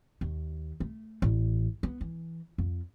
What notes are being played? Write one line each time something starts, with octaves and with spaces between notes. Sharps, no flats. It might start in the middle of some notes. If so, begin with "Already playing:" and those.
D#2
A3
A1
B3
E3
F2